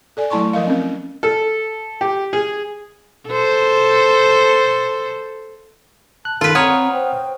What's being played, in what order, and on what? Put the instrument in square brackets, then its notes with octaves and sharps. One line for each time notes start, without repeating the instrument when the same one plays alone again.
[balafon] A4 D5 G#5
F#3 A3 E4 A5 C6 C#6
F3 A#4 D#5 F5
C4 C#4 A#4
[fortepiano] A4
G4
G#4
[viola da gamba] A4 C5
[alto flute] A5 [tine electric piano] F#6
[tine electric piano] D#3 A4 [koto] F4 B4 [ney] F5
[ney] C4 [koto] C#5 [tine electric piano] F#5 D#6 F6 [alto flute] A#5
[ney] C5 [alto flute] G5